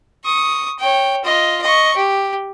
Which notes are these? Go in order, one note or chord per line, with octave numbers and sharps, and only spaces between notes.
C#6 D#6
C#5 G5
F4 D#5
D#5 C#6
G4